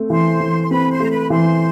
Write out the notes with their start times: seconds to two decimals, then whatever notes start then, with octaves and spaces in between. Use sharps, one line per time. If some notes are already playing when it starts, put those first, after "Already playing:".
Already playing: A3 C4
0.10 E3 C5 C6
0.40 E3
0.63 C6
0.70 C4 B4 B5
0.90 C5 C6
1.00 A3 A#5
1.10 B4 B5
1.21 B5
1.30 E3 C5 C6